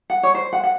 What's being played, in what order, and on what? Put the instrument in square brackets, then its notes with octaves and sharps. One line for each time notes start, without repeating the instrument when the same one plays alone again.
[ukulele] F#5
C#5
C5
F#5
F#5